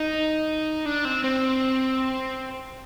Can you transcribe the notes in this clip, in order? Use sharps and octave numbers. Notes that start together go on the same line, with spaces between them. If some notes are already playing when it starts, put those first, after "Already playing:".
Already playing: D#4
D4
C4
C4